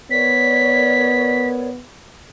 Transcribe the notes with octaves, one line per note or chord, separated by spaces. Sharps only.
B3 A#4 C#5 D5 B6